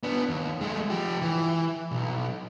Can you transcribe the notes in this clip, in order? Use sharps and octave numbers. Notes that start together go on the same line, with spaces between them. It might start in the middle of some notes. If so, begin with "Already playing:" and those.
B3 D4
D#2
G#3 A3
F3 G4
E3
B1